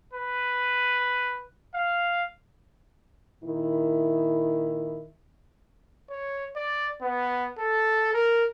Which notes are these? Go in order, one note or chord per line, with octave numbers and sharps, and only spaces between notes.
B4
F5
A#2 D#3 E4
C#5
D5
B3
A4
A#4